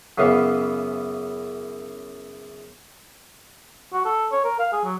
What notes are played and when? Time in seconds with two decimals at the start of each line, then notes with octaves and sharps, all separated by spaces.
0.18 F#2 C#3 E3 B3 F5
3.93 F#4
4.05 A4
4.32 C#5
4.44 A#4
4.59 F5
4.73 G#4
4.84 F#3